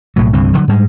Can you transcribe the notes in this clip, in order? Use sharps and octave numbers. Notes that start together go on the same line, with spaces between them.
B1 A2 F#3
C2 G2 D3 C4
D3 F#3
G#2 G3 G#3